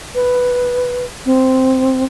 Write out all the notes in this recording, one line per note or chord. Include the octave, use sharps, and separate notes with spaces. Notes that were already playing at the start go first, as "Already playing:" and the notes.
B4
C4